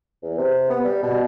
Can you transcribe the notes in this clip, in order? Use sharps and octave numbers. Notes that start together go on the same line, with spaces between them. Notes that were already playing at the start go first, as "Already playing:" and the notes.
E2
C3
B3
G3
B2